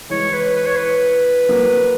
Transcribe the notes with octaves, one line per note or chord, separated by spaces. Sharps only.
E3 G#3 C#5
B4
B4
C#5
B4
F#3 A#3